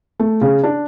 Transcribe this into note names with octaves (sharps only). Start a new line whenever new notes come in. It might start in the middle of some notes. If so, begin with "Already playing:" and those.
A3
C#3
D4